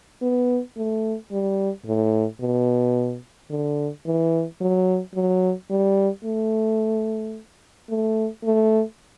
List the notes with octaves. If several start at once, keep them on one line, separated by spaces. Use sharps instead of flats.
B3
A3
G3
A2
B2
D3
E3
F#3
F#3
G3
A3
A3
A3